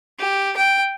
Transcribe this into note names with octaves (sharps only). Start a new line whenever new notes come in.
G4
G5